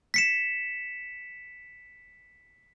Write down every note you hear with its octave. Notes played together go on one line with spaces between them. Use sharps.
B6 C#7 E7